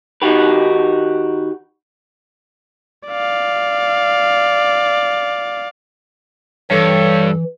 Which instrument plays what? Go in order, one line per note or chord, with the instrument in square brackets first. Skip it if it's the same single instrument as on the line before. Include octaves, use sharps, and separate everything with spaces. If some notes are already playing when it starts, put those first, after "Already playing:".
[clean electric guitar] D#3 D#4 F#4 G4 B4
[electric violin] D5 F5
[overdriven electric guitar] G2 [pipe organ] E3 [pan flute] A4 [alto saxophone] C#5